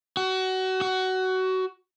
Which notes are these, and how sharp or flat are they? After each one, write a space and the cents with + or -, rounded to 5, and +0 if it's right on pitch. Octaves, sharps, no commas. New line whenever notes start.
F#4 +25
F#4 +20